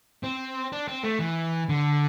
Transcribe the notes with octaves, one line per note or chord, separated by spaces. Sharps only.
C4
D4
C4
A3
E3
D3